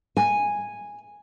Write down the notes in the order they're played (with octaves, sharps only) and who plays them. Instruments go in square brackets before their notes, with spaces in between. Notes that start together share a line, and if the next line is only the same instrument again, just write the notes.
[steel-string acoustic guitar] G#5